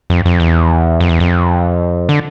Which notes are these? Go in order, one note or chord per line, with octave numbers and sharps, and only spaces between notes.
F2
F2
E2
F2
E2
F2
D3